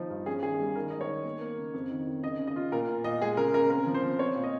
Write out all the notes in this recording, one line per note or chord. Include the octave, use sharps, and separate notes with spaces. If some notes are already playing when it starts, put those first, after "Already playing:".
Already playing: F3 D#4
G2
C#4 G#4
D#3 G#4
G3
D#3 A#4
G#3 D#5
C#5
D#3
A#3
A#3
C#3
F2
D#3
D#3
C#3 D#5
C#3
D#5
F4
A#2 A#4
A#2
A#2 D#5
G#3 G#4
C#3 A#4
C#3 A#4
C4 A#4
F3
C5
F3
C4 C#5
A#2
D#5